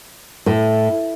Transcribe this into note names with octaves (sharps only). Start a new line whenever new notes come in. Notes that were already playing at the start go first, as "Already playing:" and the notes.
A2